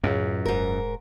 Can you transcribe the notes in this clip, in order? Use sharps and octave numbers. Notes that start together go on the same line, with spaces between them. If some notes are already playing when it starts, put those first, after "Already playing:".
C#2 F#2 A2
E1 G#2 A#4